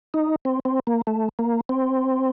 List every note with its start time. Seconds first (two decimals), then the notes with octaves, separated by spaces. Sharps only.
0.14 D#4
0.45 C4
0.65 C4
0.87 A#3
1.07 A3
1.39 A#3
1.69 C4